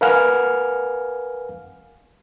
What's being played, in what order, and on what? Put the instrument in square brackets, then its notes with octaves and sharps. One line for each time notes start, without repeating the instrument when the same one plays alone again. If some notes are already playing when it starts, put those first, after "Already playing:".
[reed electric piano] A#4 B4 F5 F#5 G#5 F6